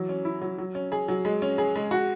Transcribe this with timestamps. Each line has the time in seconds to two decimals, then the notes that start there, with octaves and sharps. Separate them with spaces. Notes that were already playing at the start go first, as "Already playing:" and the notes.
Already playing: E3 F#3
0.09 C#4
0.25 E4
0.42 F#3
0.58 F#3
0.75 C#4
0.92 G#4
1.08 F#3
1.25 G#3
1.42 C#4
1.58 G#4
1.76 G#3
1.91 F#4